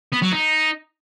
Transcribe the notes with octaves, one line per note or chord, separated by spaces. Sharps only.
B3
F#3
D#4